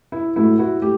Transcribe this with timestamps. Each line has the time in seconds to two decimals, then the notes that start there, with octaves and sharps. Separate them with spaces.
0.12 E4
0.36 A2 F#3 A3 E4
0.59 E4 F#4
0.82 A3 G4